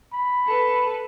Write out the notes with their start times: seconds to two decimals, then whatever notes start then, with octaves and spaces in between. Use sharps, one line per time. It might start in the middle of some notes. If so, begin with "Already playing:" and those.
0.13 B5
0.48 A4 B4